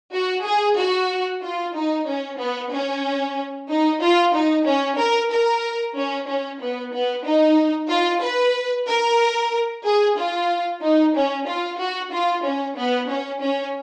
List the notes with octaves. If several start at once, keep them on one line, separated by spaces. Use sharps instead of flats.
F#4
G#4
F#4
F4
D#4
C#4
B3
C#4
D#4
F4
D#4
C#4
A#4
A#4
C#4
C#4
B3
B3
D#4
F4
B4
A#4
G#4
F4
D#4
C#4
F4
F#4
F4
C#4
B3
C#4
C#4